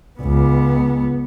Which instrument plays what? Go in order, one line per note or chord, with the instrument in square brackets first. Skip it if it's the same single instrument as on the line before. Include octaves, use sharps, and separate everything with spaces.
[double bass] C#2 B3